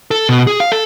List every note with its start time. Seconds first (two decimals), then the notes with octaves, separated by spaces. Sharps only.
0.11 A4
0.29 B2
0.47 G#4
0.60 F5
0.72 A4